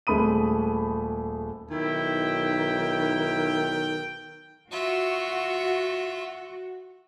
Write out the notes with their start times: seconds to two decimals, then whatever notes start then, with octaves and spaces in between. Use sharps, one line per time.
0.07 D#1 G#3 A3 B5 D#6 D#7
1.71 B1 D#3 E4 G5
4.71 F4 F#4 E5